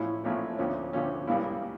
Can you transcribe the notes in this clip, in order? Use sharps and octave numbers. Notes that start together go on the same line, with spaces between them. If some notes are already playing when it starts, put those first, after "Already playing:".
Already playing: A1 A2 F3 C#4 E4
A1 A2 F3 C#4 E4
D2 D3 F3 C#4
D2 D3 F3 C#4
C#2 C#3 G3 A#3 E4